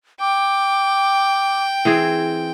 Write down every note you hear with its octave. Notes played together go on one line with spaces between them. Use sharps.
G5 D6
E3 C4 G#4